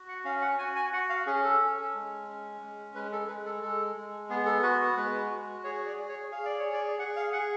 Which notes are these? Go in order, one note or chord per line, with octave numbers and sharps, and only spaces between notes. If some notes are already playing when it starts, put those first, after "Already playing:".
Already playing: F#4
F#5
C#4 F5
F#5
F#4 G#5
G#5
F#4 F#5
F5
C#4 G#4
A4
C#4
G#3
C#4
G#3
G#3 B4
A4
G#3 B4
A4
G#3 A4
G#3
B3 G#4
A4
F#4 B4
G#3 B4
F#4
G#4 C#5
D5
G#4
C#5
G#4 F5
D5
C#5
G#4
D5
G#4 F#5
F5
G#4 F#5